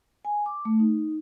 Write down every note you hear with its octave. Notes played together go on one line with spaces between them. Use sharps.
G#5
D6
A3
D#4